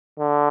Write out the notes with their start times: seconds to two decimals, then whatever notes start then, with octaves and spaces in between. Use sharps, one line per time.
0.19 D3